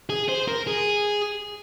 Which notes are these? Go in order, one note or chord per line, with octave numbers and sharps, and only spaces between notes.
G#4
C5
A#4
G#4